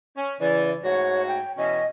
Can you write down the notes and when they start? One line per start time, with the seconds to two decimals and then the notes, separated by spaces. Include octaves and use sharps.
0.17 C#4
0.40 C#3 E3 D5
0.84 G#2 A3 F#4 C#5
1.28 G5
1.58 B2 E3 C#4 D#5